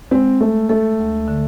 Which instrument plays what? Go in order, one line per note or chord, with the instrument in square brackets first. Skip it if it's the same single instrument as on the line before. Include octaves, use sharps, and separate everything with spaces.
[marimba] G#3 [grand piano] C4
[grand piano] A3 [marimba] A4
[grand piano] A3 [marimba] A4
[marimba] D2
D3